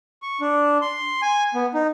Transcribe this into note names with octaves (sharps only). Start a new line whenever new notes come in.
C#6
D4
C6
G#5
B3
D#4